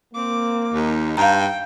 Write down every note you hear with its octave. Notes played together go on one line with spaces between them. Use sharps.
A#3 C4 D6
D#2 D#4
G2 F5 G5 A#5